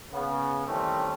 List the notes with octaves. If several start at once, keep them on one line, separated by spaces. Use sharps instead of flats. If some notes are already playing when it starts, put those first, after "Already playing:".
C#3 B3
D#3 E3 G3 A3 C4 C#4